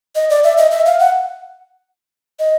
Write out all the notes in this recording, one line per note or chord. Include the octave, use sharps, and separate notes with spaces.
D#5
D5
E5
D#5
E5
F5
F#5
D#5